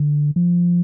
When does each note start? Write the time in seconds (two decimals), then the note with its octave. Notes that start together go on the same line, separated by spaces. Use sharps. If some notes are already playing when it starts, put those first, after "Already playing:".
Already playing: D3
0.36 F3